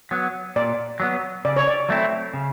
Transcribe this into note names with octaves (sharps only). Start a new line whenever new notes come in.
F#3 B3
A#2 D5
F#3 B3
C#3 D5
C#5
D5
F#3 A3 C4 E4
C#3